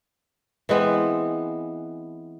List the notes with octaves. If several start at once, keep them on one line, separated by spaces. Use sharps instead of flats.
E3 G#3 B3 C4